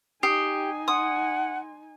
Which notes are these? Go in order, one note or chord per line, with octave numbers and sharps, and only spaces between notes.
D#4 G4 G5 G#5 D#6 C7
F#5 C6 D#6